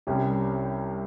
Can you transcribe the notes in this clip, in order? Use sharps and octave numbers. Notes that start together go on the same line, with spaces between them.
C2 C3 G3 C#4 G4